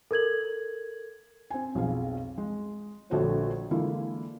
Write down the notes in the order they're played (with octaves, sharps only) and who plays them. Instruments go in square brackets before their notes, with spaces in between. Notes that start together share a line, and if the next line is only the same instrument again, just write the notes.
[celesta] A4 A#4 G#6 F#7
[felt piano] C4 G#5
B1 F2 G#4 F5
G#3
A#1 D3 A3 F#4 C5 C#5
D3 E3 G#3 A#3 E4 F4